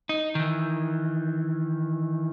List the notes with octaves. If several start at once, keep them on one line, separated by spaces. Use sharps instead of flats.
D#4
D#3 E3